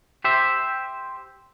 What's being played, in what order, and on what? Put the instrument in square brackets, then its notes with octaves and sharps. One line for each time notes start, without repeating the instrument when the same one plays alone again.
[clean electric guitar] G4 C5 E5